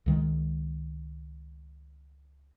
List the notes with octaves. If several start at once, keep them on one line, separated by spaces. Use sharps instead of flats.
C#2 D#3 G#3